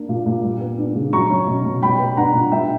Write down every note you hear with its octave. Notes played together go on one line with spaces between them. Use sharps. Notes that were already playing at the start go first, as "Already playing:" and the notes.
Already playing: A#3 D4
A#2
A#2
G3
B3
D4
C#3
F#3 A#5 C#6
C#4
B2
B2
G3 G5 B5
B3
D4 F#5 A#5
A#2
G3 E5 G5